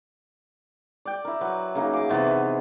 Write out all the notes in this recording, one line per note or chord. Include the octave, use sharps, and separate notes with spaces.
D5 G5
E4 A#4
F#3 B4
C#3 A#3 D#4
G#4 D6
C3 D#3 E3 B3